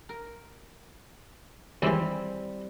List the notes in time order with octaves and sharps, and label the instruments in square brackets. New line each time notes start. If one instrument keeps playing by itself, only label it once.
[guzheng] A#4
[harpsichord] D#2 G#2 E3 [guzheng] G3 C4 E4